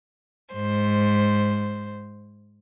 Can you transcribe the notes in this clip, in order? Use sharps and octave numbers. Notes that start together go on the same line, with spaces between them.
G#2 C5